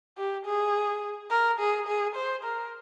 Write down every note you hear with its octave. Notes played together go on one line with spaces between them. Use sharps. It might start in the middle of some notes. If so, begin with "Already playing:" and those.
G4
G#4
A#4
G#4
G#4
C5
A#4